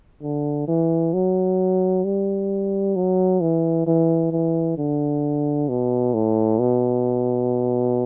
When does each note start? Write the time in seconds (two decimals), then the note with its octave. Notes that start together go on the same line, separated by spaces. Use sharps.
0.22 D3
0.68 E3
1.13 F#3
2.04 G3
2.96 F#3
3.41 E3
3.87 E3
4.31 E3
4.77 D3
5.69 B2
6.14 A2
6.59 B2